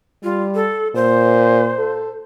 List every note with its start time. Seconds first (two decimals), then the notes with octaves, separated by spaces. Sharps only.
0.23 G3 F4
0.55 A4
0.95 A#2 C5
1.78 A4